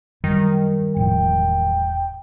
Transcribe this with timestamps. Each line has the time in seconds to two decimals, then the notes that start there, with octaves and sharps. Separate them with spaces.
0.24 F#2 D#3 G3
0.96 E1 A2 F3 G5